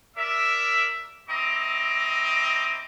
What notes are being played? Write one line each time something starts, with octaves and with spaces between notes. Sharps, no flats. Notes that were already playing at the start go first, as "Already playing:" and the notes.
A#4 D5 E5
C4 E4 D#5 A#5 D6